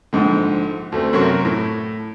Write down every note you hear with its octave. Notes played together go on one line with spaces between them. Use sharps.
A#1 G#2 D3
D2 A3 C4
F#2 C3 F#3 A#4 C#6
A2